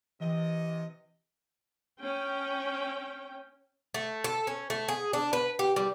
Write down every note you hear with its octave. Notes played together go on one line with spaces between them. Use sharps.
C3 E3 D#5
C#4 G5
A3
A4
C#4
A3
G#4
D4
B4
G4
G3